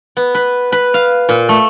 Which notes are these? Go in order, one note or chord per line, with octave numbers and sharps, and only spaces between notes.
B3
B4
B4
F5
A#2
A3